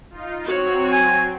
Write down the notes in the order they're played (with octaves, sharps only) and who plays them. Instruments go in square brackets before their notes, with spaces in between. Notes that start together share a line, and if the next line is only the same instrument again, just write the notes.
[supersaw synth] D#4 F4
[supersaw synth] F#3 C4 [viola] F#4 C#5
[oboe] G#5